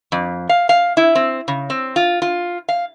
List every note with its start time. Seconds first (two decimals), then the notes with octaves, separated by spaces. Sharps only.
0.12 F2
0.49 F5
0.69 F5
0.97 E4
1.15 C4
1.48 C#3
1.70 C4
1.96 F4
2.22 F4
2.69 F5